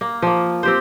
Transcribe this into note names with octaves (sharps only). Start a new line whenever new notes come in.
A#3
F3 A#3
C4 G4 C5